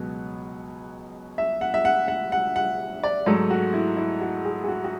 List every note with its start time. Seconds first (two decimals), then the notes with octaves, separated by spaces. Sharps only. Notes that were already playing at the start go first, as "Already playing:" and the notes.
Already playing: C#2 B2 F#3 B3
1.38 E5
1.61 F#5
1.74 E5
1.85 F#5
2.08 F#5
2.32 F#5
2.56 F#5
3.03 D5
3.26 G#2 F#3 A3 A4
3.50 F#4
3.74 E4
3.97 E4
4.21 F#4
4.45 G#4
4.64 G#4
4.68 F#4
4.84 F#4